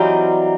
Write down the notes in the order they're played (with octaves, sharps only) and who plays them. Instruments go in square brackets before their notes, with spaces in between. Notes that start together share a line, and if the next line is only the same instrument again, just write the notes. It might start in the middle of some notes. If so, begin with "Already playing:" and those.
Already playing: [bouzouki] E3 G3 C4 D#4 [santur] F#3